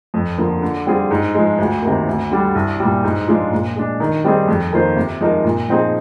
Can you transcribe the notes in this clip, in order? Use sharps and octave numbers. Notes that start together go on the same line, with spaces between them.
F2
D3 F3 A#3
D3
G3 C4 F4 G#4
G#2
F3 G#3
D2
C3 D#3 A#3
D2
D3 G3 D4
C2
A#2 G3
G#2
F3 G#3 D4 F4
A#2
G#3 D4
D#3
G3 C4 D#4 G#4
F2
D#3 A#3 F4 C5
C3
F3 G#3 D#4 A#4
A#2
F3 C4 D#4 G#4